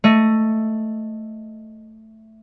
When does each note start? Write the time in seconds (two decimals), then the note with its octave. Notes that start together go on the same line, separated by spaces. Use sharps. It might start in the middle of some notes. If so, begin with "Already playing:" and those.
0.04 A3 D#5